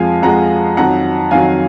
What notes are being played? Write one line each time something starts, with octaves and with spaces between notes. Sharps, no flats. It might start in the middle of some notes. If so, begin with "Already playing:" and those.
Already playing: F2 F3 G#3 F5 G#5
F2 F3 G#3 F#5 A#5
F2 D#3 F#3 F#5 A#5
F2 D#3 F#3 F5 G#5